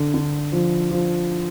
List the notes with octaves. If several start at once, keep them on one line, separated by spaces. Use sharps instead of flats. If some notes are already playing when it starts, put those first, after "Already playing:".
Already playing: D3
D3
F3
F3